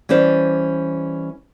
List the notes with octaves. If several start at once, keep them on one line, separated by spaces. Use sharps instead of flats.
E3 G3 C#4 C5 D5